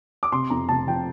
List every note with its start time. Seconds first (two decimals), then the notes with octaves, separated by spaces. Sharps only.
0.23 D6
0.32 C3 C6
0.50 F2 A#5
0.69 F1 A5
0.87 F3 G5